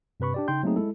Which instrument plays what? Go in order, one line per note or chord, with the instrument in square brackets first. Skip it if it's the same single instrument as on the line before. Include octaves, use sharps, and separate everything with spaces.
[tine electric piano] G2 C3 B4 B5 C#6
D4 G4 D5
C#3 D#4 G5 C6 G6
F#3 A3 A#3 C4 D#4 G#4
G#3 E4 A4